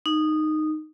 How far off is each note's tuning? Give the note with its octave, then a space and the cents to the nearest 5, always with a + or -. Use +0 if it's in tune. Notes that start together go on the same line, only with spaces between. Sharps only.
D#4 -10